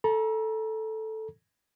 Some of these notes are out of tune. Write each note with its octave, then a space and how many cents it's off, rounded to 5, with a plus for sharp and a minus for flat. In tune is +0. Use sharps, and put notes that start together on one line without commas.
A4 +0 A#5 +35